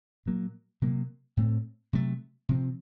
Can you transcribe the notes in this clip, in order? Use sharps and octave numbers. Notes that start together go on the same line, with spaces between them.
A#2 F#3 A#3
C3 F#3 A#3
A2 A3 C4
C3 F#3 A3
C3 F3 C4